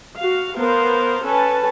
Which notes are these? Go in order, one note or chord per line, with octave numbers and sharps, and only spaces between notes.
F#4 F5
B3 A#4 C5 F5
C#4 A4 B4 A5